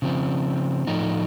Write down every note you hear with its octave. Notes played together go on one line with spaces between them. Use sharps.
C#3 F3 C4
A2 F3 A3 D#4